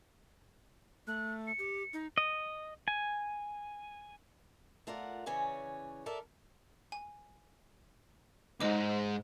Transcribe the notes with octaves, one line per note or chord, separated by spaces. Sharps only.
A3 F#6
C#7
G4
D#4
D#5
G#5
A3 F4 A#4 D5 F#5
C#3 E3 C#4 C#5 D5
A4 A#4 D5 E5
G#5
C#2 G#2 C5 D#5 D6